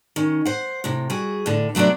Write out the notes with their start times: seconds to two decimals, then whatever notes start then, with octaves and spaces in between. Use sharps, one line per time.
0.16 D#3 C#4
0.45 C5 F#5
0.84 A2 C3
1.10 G3 F#4 G#4
1.46 A2 D3
1.75 C3 F#3 A3 B3 D4